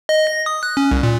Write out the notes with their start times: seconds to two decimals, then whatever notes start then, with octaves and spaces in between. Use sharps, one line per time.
0.09 D#5
0.27 A#6
0.46 D#6
0.63 F#6
0.77 C#4
0.91 C2
1.03 A#2